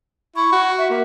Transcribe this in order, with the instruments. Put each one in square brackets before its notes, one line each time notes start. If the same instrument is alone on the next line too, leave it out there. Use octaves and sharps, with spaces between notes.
[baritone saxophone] E4 [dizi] C#6
[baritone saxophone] F#4
[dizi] E5
[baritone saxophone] A#3 [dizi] E5